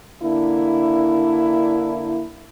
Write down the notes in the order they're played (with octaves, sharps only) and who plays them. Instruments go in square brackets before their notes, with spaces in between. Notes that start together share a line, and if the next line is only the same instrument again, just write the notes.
[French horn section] D3 A#3 D4 E4